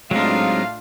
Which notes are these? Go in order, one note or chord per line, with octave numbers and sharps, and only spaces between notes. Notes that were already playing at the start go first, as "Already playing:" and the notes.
A2 F#3 G#3 C4 D4 D#4 F4 F5